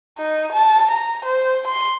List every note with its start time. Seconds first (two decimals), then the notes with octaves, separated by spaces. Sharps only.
0.18 D#4
0.53 A5
0.91 A#5
1.25 C5
1.68 C6